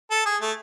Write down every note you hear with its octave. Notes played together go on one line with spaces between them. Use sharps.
A4
G#4
A3